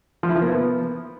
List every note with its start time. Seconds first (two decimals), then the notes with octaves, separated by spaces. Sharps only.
0.23 F3
0.29 E4
0.35 F3
0.42 A#3
0.48 B3